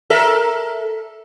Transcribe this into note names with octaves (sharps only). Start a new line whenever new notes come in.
A4 A#4 E5